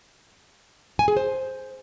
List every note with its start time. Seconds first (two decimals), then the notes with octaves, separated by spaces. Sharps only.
0.99 G#5
1.08 G#4
1.17 C5